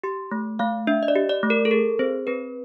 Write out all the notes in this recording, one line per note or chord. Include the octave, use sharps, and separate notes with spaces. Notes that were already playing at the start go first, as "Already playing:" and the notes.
G4 C6
A3
A3 F5
D4 E5
D#5
D5
G4
D5
A3
A#4
A4
G#4 A#4
C4 C5
C4 B4